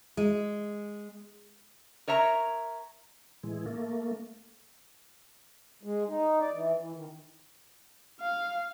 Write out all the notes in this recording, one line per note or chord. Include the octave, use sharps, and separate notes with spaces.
G#3
A#4 C#5 E5 A#5
A2 E3 G#3
A3 A#3
G#3
D#4
D5
E3
E3
D#3
F5